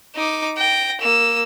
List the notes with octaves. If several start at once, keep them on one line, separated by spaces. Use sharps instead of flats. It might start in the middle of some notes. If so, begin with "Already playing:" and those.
D#4 D6
G5 A#6
A#3 E6